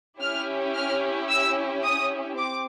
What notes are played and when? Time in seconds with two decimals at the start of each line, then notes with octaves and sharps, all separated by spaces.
0.18 C#4 E4 G4 F6
0.74 F6
1.29 E6
1.83 D#6
2.38 C4 D6